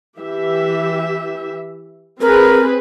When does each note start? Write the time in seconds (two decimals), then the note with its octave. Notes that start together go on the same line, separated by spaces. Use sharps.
0.19 E3 G4 E5
2.21 C4 G#4 A#4 B4